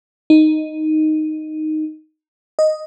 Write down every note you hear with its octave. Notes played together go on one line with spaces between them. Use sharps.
D#4
D#5